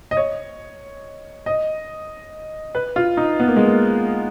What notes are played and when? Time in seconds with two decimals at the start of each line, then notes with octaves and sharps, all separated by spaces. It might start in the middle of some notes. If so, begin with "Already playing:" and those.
0.11 D#5
0.17 C#5
1.46 D#5
2.75 B4
2.96 F4
3.17 D#4
3.40 B3
3.48 A#3
3.56 G#3
3.65 A#3